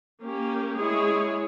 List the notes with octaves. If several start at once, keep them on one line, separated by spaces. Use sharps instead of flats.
A#3 C#4 G4
G#3 E4 G#4 C#5